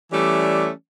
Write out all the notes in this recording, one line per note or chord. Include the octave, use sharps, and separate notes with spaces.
E3 G3 A3 C#4 D5